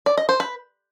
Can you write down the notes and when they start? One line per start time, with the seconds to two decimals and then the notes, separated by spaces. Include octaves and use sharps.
0.06 D5
0.17 D#5
0.29 C5
0.40 B4